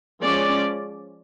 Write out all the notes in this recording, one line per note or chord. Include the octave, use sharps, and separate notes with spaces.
F3 G#3 C#4 D5